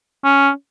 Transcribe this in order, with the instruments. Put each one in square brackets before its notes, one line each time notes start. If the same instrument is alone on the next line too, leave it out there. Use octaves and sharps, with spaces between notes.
[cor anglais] C#4